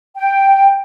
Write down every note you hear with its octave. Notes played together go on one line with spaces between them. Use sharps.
G5